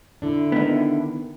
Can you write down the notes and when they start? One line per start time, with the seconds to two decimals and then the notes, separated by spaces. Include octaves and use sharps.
0.22 D3 D4 E4
0.52 D#3 B3